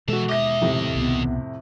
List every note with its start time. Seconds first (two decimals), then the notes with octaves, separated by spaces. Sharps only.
0.08 B2 E3 G#3 F#4 A4 E5
0.29 D#2 D#5 E5 D6 A#6
0.61 F2 A2 C3
0.96 C2 B2 B3